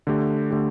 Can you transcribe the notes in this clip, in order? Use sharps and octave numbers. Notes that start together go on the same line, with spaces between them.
D3 A3 G4
D3 A3 G4